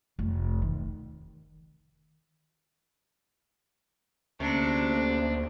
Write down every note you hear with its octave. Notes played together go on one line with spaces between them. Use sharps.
F1
D#3
D2 C3 A#3 C#4 D4